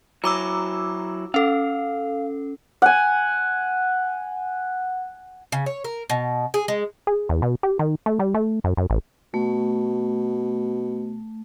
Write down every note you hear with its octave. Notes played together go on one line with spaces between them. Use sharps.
F#3 E4 A#5 D6 E6
C#4 A4 F5
F#5 G#5
C#3
C#5
A#4
B2
G#4
G#3
G#4
E2
B2
G4
D#3
A3
G3
A3
F#2
F#2
A1
B2 A3